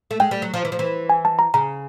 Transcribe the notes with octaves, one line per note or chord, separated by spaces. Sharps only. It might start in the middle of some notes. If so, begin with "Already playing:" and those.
A3
G#3 G5
G3
F#3
F3
E3
F3
E3
G#5
A5
A#5
C#3 A#5